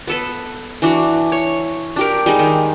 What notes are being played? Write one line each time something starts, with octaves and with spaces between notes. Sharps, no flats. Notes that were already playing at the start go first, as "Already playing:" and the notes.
B3 A4 B4
E3 D4 F#4
C#5
D4 G4 A#4
G3 G#3 D#4
D#3